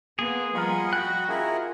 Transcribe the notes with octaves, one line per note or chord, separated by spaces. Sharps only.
A#3 B3 G#4 C6
F3 G3 F4 A#4 D#5 F#5 B5
F#4 G5 F#6
C#4 E4 F4 G#4 A#4